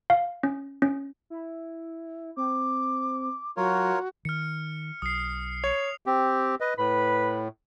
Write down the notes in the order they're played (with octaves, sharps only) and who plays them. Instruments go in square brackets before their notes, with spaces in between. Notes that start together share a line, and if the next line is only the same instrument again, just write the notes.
[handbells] F5
C#4
C#4
[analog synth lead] E4
[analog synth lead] C4 [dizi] D6
[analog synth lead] F#3 [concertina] F4 A#4 C#5 [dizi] F#4
[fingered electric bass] D#3 [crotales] F6 C#7
[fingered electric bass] B1 [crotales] D#6 C7
[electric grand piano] C#5 [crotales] F7
[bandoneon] C4 G4
B4 D#5
[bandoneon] A2 [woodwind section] B4 B5